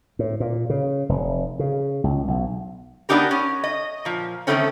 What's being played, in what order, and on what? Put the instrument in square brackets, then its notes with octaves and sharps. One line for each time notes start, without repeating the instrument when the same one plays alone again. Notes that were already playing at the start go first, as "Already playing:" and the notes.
[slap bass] A2
A#2
C#3
F1
C#3
C#2
B1
[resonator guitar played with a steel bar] B3 D4 D#4 G4 A#4
C#4
D#5
A#2 F3
D3 D#3 G#3 A3 C4 C#4